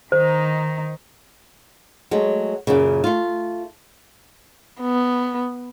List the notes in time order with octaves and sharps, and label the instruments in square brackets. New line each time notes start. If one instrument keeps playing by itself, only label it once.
[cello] D#3 D#4 [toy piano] C5
[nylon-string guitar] F#3 G#3 A3
F#2 A#2 C#3
A3 F4
[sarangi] B3